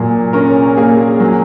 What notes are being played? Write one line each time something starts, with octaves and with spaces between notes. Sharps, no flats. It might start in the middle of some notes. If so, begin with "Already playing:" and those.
Already playing: A#2 F#3 G#4
C#4 A#4
A#3 G#4
F#3